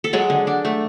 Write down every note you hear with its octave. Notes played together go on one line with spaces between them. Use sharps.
A4
F#3 G#3 G#4
D3
D4
A3